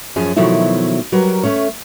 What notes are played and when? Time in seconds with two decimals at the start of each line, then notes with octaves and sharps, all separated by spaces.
0.16 F#2 F3 C#4 G#4 G#5
0.36 B2 D#3 F3 F#3 A3 E4
1.12 F#3 G3 A#4 B4
1.43 A3 C#4 C#5